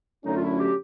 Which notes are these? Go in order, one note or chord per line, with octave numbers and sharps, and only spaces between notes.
F#2 D3 F#3 A3 C#4 D#4
F4
E4
G4